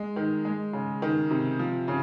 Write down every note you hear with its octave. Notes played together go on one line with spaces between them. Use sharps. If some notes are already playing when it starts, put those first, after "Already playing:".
Already playing: G#3
D#3
G#3
C#3
D#3
C3
F3
C#3